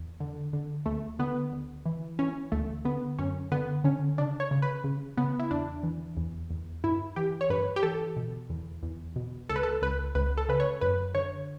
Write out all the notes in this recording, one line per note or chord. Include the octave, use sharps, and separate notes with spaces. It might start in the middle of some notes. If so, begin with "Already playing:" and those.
Already playing: E2
D3
D3
D2 A3
D3 B3
D2
E3
E3 C#4
D2 A3
D3 B3
F#2 C#4
D3 B3
D3 C#4
C#3 D4
C#5
C#3
B4
C#3
C#3 B3
E4
E2 D4
E3
E2
E2
G2 E4
E3 G4
C#5
G2 B4
G4
E3 A4
B2
E2
E2
B2
C#2 A4
B4
A4
C#2 B4
C#2 B4
A4
C#3 B4
C#5
F#2 B4
D3 C#5